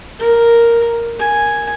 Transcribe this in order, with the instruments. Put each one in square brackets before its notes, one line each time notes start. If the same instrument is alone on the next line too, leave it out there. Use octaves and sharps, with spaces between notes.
[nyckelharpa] A#4
G#5